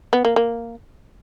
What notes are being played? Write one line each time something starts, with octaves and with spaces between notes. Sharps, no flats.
B3
A#3
A#3